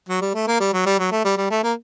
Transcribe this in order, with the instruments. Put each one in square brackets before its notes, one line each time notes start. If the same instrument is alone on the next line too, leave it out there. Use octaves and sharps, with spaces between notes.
[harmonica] F#3
G3
A3
A#3
G3
F#3
G3
F#3
A3
G3
G3
A3
A#3